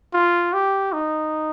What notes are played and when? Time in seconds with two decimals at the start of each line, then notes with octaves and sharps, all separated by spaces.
0.13 F4
0.53 G4
0.93 D#4